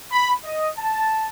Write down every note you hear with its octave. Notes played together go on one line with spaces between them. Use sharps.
B5
D#5
A5